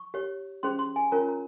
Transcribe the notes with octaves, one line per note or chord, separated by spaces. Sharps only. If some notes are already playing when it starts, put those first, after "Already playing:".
Already playing: C#6
G4 C#5
C#4 G#4 C5 C6
C6
G#5
C#4 F4 A#4 C#5 A#5
A#5